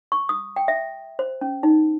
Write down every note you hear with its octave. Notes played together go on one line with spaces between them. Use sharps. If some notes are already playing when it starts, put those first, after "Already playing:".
C#6
D#6
G5
E5
C5
C#4
D#4